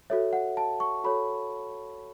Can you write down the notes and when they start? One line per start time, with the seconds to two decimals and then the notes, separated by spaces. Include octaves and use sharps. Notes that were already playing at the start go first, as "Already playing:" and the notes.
0.10 F#4 A4 C#5 E5
0.33 F#5
0.57 A5
0.80 C#6
1.04 F#4 A4 C#5 B5